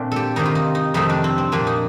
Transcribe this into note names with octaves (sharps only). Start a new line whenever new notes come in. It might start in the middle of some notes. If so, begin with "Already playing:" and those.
Already playing: A#2 A3 C4 D4
G4 A4
C3 D#3 A#3 D#4
F4
D#4
D#4
F2 C3 D#3 A3 D#4
D4
C4
C4
A#2 F3 A#3 D4
D#4